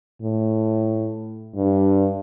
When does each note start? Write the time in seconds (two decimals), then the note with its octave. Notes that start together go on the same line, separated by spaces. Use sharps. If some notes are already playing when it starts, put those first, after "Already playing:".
0.22 A2
1.56 G2